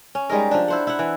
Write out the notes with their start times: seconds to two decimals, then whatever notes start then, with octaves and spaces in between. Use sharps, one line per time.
0.15 C#4
0.29 G3 G#3 D#4 A#4
0.51 F3 D4
0.68 E4 C5 F#5
0.87 E4 F#5
0.99 E3